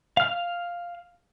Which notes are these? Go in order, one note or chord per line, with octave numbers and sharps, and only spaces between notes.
F5 F6